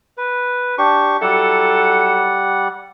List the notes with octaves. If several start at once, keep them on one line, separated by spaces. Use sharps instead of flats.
B4
D4 G4 C#6
F#3 G3 E4 A4 F#5